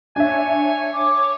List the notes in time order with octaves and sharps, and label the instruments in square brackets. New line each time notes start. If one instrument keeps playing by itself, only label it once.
[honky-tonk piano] D4 E5 [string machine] C#5 [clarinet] G#5
[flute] D6